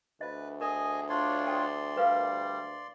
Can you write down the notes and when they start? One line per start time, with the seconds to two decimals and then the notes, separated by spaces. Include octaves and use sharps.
0.21 D2 B4 D#5
0.61 G#4 A#4 D#5 G#5
1.09 D4 F4 C#5 D5 C6
1.47 A4 G5
1.97 G3 A#4 B4 F5